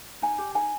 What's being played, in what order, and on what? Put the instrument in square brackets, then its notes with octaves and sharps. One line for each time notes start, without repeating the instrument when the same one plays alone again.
[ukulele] D#4 G#5
G4
D#4 G#5